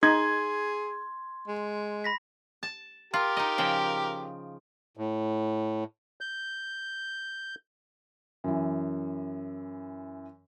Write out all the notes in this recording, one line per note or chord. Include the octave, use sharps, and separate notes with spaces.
D#4 G#4 C6 G#6
G#3
B5 A#6 B6
A5
F4 G4 A#4
D#4 D#5
C#3 F3 G5
A2
G6
F#2 E3